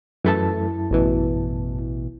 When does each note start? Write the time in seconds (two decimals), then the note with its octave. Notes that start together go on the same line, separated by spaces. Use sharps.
0.24 F#2 E3 A3 E4 A4 A5
0.91 A1 B2 E3